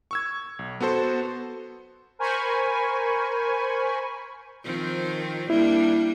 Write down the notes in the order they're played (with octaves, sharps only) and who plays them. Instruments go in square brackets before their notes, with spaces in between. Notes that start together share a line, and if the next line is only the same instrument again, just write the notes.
[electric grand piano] C#6 E6 G#6
B1
B3 F#4 A4 C5
[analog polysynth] A#4 C5 G#5 B5 C#6
[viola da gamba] D#3 F3 C4
[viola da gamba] G3 A#3 D4 [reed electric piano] E4